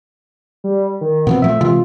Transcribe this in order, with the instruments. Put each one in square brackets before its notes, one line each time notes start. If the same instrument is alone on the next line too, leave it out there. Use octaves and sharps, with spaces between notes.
[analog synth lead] G3
D#3
[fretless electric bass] B2 F3 C4 [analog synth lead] B3
[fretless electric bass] A#2 F3 A3 [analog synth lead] E5
[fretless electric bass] C3 E3 G#3 [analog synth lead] F4